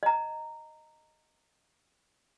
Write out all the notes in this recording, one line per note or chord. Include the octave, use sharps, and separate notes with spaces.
D#5 A#5